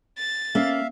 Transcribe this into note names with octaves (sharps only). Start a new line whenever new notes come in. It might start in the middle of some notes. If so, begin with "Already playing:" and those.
A6
A#3 C#4 E5 F5